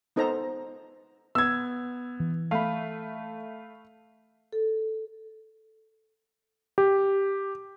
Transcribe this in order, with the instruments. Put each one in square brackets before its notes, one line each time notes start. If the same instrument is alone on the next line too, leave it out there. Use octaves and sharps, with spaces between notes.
[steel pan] B3 D#4 A4 C5 A#5
[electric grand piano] B3 [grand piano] E6 G#6
[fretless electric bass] E3
[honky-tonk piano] A3 [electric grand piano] F5 B5
[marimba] A4
[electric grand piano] G4